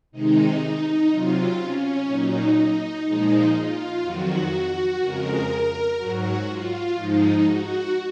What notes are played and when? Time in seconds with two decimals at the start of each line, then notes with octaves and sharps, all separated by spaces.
0.12 C3 D#3 G#3 D#4
0.61 D#4
1.10 C3 F#3 F4
1.58 C#4
2.07 A#2 F#3 D#4
2.56 D#4
3.05 A#2 F3 G#3 D#4
3.54 F4
4.02 F2 D#3 F#3 F#4
4.99 F2 C#3 G#3 A#4
5.97 G#2 F#3 F#4
6.46 F4
6.95 G#2 F3 G#3 D#4
7.43 F#4